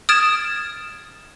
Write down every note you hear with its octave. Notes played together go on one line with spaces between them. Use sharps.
D#6 F6 G#6 A6 D7 E7